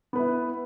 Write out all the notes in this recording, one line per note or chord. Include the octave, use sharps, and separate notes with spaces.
B3 E4 B4